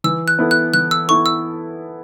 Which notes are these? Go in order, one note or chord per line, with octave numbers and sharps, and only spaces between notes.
E3 E6
F#6
B3 E4 A4
F#6
E3 F#6
E6
B3 E4 A4 C#6
E6